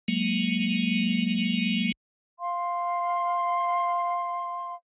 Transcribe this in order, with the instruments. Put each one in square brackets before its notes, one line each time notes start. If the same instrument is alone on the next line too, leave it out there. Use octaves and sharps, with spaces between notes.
[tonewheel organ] F#3 G#3 A#3
[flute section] F5 C6